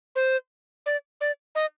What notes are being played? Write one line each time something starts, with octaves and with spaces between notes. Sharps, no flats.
C5
D5
D5
D#5